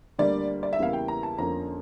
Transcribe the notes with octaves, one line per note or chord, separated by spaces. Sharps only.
D2 D3 G3 A#3 D5
D5
E5
E2 C#3 G3 A#3 E4 F5
G5
A#5
A5
F2 D3 F3 A#3 C#4 A#5